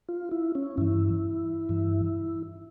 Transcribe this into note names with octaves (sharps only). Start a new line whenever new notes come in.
F4
E4
C#4
G2 E3 E4
G2 E3